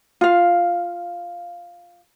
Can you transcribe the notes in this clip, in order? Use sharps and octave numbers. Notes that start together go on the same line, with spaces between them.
F4 F5